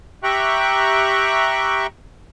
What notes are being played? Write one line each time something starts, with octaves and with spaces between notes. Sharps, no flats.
G4 E5 G5 A#5 C#6 F#6